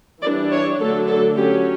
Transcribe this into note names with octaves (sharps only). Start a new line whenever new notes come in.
E3 G3 D4 D5
C#5
D3 F#3 A3 D4 A4
A4
F#3 C#4 G4